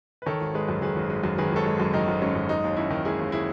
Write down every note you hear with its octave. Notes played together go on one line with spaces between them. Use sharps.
B4
D#3 A4 C#5
G#1
G#3 G#4 B4
F#2
D#3 G#4 B4
G#1
G#3
F#2
D#3 G#4 B4
G#1 A4 C#5
G#3
F#2
D#3 D#4
G#1
G#3 C#4
F#2
G#3 D#4
D#2
D#2 C#4 E4
D#3
G#3 E4 G#4
D#2
E4 G#4